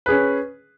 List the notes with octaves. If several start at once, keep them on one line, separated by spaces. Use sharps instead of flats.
C#4 G#4 B4